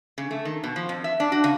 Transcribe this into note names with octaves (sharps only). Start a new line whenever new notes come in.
C#3
A3
D#3
B2
F3
F2
E5
D4
F#4
C#3